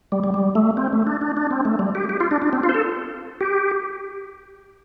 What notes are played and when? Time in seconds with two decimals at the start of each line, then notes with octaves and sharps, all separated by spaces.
0.12 G3
0.24 G3
0.34 G3
0.55 A3
0.77 C4
0.93 A3
1.07 D4
1.21 D4
1.37 D4
1.51 C4
1.65 A3
1.79 G3
1.95 G4
2.09 G4
2.20 F4
2.31 D4
2.42 D4
2.53 C4
2.63 F4
2.69 C5
2.74 A4
3.41 G4